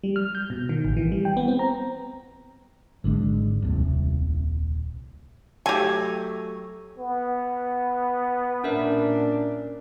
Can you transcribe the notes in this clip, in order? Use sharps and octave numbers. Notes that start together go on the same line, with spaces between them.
G3
F6
G6
B2
D#3
A1
E3
G3
G5
B3
C4
A#5
G#1 D3 D#3 G#3
D#1 C2
F#3 A3 G4 G#5
B3
A#2 C#4 D4 A#4 E5